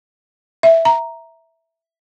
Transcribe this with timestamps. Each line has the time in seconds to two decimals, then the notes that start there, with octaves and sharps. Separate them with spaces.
0.63 E5
0.85 A#5